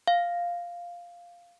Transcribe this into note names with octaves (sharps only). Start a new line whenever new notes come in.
F5